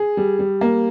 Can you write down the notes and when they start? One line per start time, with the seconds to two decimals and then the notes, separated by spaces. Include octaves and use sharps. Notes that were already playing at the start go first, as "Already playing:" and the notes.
Already playing: G#4
0.17 G3
0.39 G3
0.61 A#3